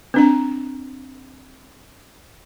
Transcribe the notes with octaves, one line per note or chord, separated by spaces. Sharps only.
C4 D4 A#5